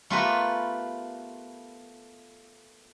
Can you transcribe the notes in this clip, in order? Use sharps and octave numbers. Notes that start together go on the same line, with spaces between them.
A3 B3 F4 G4 A#4 B4